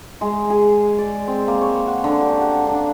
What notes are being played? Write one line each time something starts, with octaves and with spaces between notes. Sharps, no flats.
G#3
G#4
D5
C4
A#3
C#5
F#5
D3
G4
F#5
D4